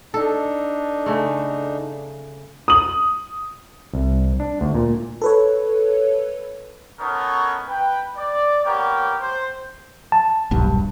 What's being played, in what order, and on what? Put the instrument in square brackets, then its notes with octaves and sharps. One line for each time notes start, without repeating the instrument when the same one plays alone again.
[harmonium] D4 D#4 [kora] A4
[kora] C#3 A3
[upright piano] D#6 F#7
[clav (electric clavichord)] C2
D4
D2
A#2
[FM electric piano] A4 B4 C#5
[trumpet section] B3 C#4 D#4 A4 A#4 C#5
B4 G5
D5
A#3 B3 G4 A#4 C#5 G5
C5
[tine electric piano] A5
[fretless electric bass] D#1 B1 G2